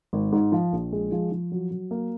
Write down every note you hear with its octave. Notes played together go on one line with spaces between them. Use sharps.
G#1
G#2
F3
A#1
G#3
F3
F3
F#3
F#3
A#3